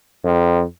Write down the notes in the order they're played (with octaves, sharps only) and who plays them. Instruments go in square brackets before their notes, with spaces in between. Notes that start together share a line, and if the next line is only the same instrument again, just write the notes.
[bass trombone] F2